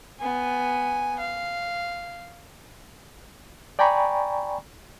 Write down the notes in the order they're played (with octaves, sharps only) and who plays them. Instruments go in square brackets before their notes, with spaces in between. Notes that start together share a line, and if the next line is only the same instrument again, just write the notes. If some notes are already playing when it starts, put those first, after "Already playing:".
[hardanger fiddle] B3 G#5
F5
[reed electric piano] D5 G5 G#5 A#5 B5 C#6